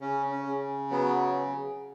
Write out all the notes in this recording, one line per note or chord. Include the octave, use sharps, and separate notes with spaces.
C#3 C#4
C#4
C#3
F#3 B3